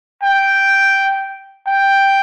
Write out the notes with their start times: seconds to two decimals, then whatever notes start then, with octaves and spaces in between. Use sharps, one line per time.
0.23 G5
1.67 G5